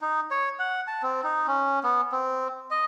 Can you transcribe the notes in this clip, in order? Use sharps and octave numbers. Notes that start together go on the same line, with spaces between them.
D#4
C#5
F#5
A5
C4
D#4
C#4
B3
C4
D#5